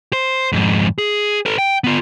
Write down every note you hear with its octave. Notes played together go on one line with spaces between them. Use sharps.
C5
F2 G#2
G#4
A4 B4
G5
B3 F4